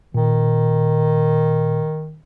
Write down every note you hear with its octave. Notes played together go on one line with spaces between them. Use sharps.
A#2 D#3